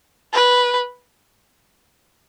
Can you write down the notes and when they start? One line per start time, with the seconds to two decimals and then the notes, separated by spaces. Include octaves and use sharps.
0.33 B4